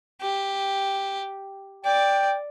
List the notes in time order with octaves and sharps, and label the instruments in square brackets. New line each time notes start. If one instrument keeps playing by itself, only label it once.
[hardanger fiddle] G4
[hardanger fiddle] D5 [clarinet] G5